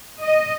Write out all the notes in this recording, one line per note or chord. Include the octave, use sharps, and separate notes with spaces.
D#5